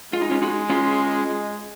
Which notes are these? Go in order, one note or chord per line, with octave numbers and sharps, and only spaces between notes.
G#3 F4
D#4
C#4 F4
D#4 F#4
C#4 F4
G#3